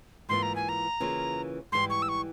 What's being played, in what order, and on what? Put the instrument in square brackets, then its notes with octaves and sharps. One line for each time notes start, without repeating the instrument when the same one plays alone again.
[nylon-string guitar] G#2 E3 A#3 F4 [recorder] C6
[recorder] A#5
G#5
A#5
[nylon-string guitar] C#3 E3 A#3 F4
[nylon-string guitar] G#2 E3 G3 [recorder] C6
[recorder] C#6
E6
C#6